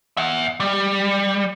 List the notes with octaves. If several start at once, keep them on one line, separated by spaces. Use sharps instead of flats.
E5 F#5
G3